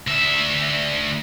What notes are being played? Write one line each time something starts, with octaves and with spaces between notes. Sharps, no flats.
D2 E5